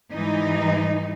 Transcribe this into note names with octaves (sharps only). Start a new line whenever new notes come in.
G#2 E3 G3 D#4